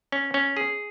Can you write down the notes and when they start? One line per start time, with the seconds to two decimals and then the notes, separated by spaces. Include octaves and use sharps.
0.12 C#4
0.34 C#4
0.57 G#4